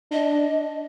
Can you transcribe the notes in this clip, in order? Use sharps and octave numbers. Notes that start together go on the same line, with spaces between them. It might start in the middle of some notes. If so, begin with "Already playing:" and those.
D4 D#5